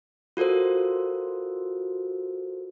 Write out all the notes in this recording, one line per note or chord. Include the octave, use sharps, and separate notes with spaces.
F4 F#4 A4 A#4 C5